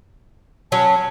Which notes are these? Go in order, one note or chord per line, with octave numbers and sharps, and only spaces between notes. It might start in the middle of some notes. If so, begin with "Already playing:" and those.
F#3 C#4 A5